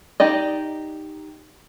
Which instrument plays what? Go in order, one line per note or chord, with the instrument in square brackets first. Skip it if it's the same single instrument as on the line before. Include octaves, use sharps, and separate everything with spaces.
[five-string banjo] D#4 G4 D5 D#5